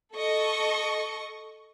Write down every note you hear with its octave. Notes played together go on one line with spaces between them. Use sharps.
A4 D#5 C#6